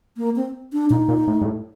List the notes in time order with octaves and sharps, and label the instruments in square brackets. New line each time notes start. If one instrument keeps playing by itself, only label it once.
[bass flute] A#3
C4
D4
[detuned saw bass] A#2 [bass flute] D#4
[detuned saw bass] A#2
A2
G2
A2